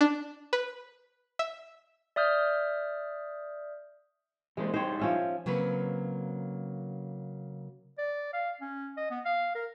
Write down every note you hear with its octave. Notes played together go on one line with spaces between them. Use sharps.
D4
B4
E5
D5 E5 D#6 F6 G6
E3 G#3 A#3 C5
G2 D#4 C5 C#5 G5
F3 C#4 E5
C#3 F#3 A#3 C4 B4
D5
F5
C#4
D#5
B3
F5
A#4